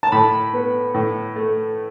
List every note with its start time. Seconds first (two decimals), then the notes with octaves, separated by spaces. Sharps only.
0.03 A5
0.12 A2 B5
0.53 B3
0.94 A2
1.36 A3